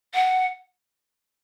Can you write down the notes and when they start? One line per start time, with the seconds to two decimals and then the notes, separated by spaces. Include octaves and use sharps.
0.14 F#5